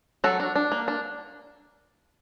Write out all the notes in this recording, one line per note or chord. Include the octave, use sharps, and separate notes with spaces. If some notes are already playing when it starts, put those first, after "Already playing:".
F#3 F#4 A4
D4
D4
A#3
D4